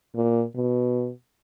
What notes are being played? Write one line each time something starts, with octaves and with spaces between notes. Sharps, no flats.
A#2
B2